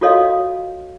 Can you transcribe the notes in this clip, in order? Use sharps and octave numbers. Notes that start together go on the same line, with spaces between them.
F4 F#4 A4 C#5 D#5 F5